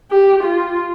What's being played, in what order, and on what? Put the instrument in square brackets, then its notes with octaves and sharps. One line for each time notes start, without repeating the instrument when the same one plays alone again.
[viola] G4
F4